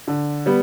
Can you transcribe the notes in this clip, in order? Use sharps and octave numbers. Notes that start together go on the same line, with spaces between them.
D3
G3 B3